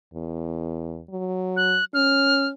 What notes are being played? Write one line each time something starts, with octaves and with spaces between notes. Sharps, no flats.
E2
F#3
F#6
C#4 F6